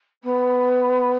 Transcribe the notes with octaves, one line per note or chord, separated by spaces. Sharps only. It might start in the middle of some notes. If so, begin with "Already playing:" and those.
B3